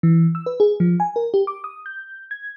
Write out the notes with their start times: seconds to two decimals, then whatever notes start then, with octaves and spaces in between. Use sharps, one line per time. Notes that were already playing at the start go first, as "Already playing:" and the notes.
0.03 E3
0.35 E6
0.46 B4
0.60 G#4
0.80 F3
1.00 G#5
1.16 A#4
1.34 G4
1.47 D6
1.64 D#6
1.86 G6
2.31 G#6